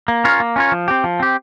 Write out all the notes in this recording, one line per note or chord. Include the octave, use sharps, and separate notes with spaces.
A#3
C#4 F4 A#4 C#5
A#3
C#4 F4 A#4 C#5
F3
C4 G4
F3
C4 G4